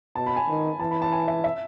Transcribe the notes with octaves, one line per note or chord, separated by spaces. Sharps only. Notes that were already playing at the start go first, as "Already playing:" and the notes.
B2 A5
B5
G#5
D#3
E3 A5
B5
A5
G#5
E5
E5